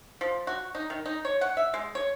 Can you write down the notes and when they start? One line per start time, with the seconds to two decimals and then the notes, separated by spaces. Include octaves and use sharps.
0.21 F3
0.47 F#4
0.75 D#4
0.90 D#3
1.06 D#4
1.25 C#5
1.41 F#5
1.57 E5
1.74 G#3
1.95 C#5